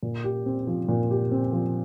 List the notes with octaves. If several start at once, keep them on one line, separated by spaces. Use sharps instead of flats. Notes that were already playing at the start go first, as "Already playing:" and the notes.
A#2
G4
C4
F3
A#2
G4
C4
F3